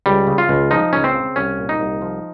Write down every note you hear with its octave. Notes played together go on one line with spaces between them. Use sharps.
C#2 G3
C#3
F4
C#2
F3 D#4
C#2 C#4
C4
C#3
C2 C#4
A#2
D#4
C2
F3